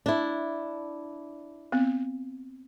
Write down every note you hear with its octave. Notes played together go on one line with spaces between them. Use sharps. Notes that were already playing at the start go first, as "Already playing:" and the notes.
D4 E4
B3 C4